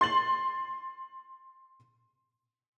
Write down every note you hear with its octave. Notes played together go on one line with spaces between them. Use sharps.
C6 A6 F#7